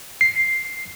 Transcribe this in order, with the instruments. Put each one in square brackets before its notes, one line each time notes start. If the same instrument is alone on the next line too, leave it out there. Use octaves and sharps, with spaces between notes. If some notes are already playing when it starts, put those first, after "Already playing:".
[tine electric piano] C7